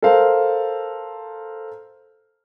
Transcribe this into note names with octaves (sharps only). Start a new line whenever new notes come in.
A4 A#4 C5 F5